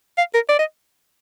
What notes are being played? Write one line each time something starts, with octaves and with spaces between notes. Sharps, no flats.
F5
A#4
D5
D#5